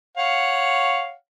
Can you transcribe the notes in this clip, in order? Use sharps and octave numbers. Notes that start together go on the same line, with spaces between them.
C#5 F5 F#5